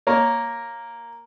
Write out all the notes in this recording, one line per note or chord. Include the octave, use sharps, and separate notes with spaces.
A#3 A#4 C#5